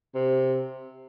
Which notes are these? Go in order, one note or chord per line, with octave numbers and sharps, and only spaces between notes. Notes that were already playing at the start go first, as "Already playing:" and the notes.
C3